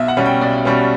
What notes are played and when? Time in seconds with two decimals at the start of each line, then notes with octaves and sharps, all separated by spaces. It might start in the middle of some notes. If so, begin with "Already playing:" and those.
Already playing: B1 E5
0.08 F#5
0.17 B2 G3 C#4
0.26 G5
0.41 B1 D5
0.65 B2 G3 C#4